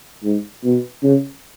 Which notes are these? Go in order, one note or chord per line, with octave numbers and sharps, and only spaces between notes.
G#2
B2
C#3